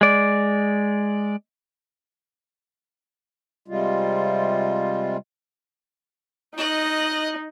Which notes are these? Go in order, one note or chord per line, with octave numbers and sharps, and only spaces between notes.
G#3 D5
C3 G3 G#3 F4
D#4 D#5 F#6